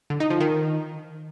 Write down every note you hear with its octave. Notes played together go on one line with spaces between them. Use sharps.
D3
D#4
F3
D#3